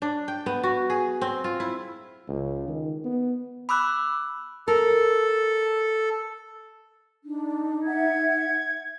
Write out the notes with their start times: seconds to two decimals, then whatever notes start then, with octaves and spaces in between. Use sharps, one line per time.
0.02 D4
0.28 G5
0.46 B3
0.63 F#4
0.90 G#4
1.21 C4
1.44 F4
1.60 E4
2.28 C#2
2.68 D#3
3.04 B3
3.69 B5 D6 E6 F#6
4.68 A4 A#4
7.26 D4 D#4
7.84 E5 F#5 G#6